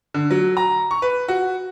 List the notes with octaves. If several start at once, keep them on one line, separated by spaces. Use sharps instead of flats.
D3
F#3
A#5
C#6
B4
F#4